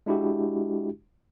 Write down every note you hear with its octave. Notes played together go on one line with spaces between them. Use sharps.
G#3 D4 E4 F#4 G4